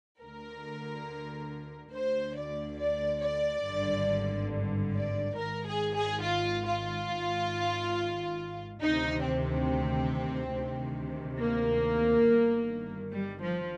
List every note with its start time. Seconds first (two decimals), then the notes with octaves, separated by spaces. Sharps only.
0.21 D2 D3 A#4
1.93 D2 D3 C5
2.37 D5
2.80 D5
3.23 D5
3.65 G#1 G2 D3
4.95 D5
5.38 G#1 G#2 D#3 A#4
5.66 G#4
5.95 G#4
6.24 F4
6.67 F4
7.10 G#1 G#2 D#3
8.82 D2 C3 D#3 D#4
9.25 C4
10.54 D2 C3 D#3
11.40 A#3
12.26 G1 G2 D#3
13.12 G3
13.41 F3